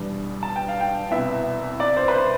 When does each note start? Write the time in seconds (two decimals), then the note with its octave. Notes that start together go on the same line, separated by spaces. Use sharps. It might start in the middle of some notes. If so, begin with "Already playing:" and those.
Already playing: E2 B2 G3 D4
0.43 A5
0.56 G5
0.68 F5
0.81 G5
1.11 C2 B2 B3 E4 E5
1.80 D5
1.96 C5
2.08 B4
2.14 C5